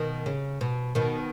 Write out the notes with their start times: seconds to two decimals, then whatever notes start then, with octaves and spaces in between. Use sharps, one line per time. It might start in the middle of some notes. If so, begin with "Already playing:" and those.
Already playing: B2 D#3
0.26 C#3
0.61 B2
0.95 B2 D#3